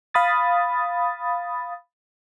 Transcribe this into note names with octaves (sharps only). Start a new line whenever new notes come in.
F5 B5 D#6 A6